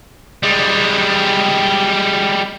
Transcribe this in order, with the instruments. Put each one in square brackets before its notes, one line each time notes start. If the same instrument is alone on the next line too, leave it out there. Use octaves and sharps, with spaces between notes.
[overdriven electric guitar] G3 G#3